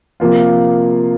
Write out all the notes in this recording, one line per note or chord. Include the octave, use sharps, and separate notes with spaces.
C3 F3 A#3 F4